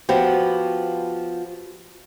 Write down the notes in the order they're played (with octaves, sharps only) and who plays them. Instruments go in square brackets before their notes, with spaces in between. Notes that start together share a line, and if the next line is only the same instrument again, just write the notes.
[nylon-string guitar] F3 B3 F#4 G4